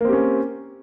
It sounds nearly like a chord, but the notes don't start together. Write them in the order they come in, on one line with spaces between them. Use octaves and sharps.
A#3 C4 G4 C#4